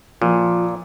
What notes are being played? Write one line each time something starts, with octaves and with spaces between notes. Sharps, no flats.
A#2 F3